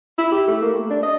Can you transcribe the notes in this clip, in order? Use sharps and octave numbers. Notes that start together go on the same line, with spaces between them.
E4
G4
A3
A#3
A3
D4
D#5